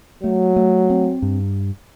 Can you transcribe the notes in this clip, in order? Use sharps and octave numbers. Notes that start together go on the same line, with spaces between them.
F#3 A3
A3
C4
G2